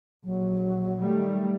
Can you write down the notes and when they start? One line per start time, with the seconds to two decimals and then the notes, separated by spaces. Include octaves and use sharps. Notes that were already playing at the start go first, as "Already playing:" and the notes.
0.24 A#1 F#3
1.01 D#3 G3 A3